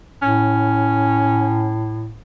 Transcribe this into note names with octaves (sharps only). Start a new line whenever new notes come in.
A2 C#4